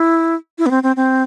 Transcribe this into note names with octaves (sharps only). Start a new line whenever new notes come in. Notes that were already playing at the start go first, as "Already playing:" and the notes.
Already playing: E4
E4
B3
C4
C4
C4